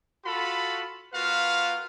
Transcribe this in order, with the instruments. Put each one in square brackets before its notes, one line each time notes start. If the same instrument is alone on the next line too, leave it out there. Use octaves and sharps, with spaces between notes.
[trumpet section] F4 F#4 A4 B5
A#3 F4 F#4 B4 F5